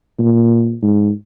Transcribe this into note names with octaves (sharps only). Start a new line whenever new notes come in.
A#2
G#2